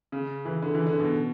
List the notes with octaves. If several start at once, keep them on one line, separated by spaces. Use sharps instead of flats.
C#3
E3
D3
E3
D3
B2